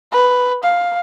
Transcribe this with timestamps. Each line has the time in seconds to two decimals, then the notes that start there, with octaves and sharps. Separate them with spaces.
0.12 B4
0.63 F5